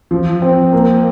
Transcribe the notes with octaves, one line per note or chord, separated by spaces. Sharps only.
F3
C4
A#3